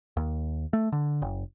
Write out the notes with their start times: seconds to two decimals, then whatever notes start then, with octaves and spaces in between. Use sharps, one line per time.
0.17 D#2
0.73 A3
0.92 D3
1.22 F#1